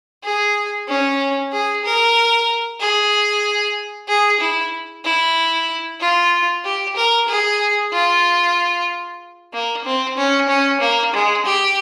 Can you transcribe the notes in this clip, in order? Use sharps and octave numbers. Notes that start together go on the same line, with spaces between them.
G#4
C#4
G#4
A#4
G#4
G#4
E4
E4
F4
G4
A#4
G#4
F4
A#3
C4
C#4
C#4
A#3
G#3
G4